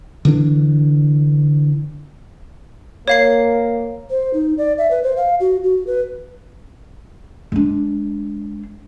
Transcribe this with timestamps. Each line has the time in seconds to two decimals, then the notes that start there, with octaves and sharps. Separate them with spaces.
0.25 D3 E3 D4
3.08 A#3 C#5 F5 C7
4.09 C5
4.34 D#4
4.58 D5
4.78 E5
4.91 B4
5.03 C5
5.17 F5
5.40 F#4
5.64 F#4
5.87 B4
7.52 G#3 D4